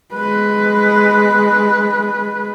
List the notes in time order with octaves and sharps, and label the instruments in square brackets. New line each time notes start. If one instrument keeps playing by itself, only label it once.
[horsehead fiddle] G#3 B4